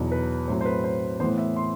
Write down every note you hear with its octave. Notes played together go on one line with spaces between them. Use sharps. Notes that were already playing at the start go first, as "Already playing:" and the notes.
Already playing: E2 B2 F#3 B3 D#4
B4
A2 F#3 C4 C5
C5
B4
C5
A2 E3 B3 C5
E5
C6